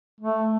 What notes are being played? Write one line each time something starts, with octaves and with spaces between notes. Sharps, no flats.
A3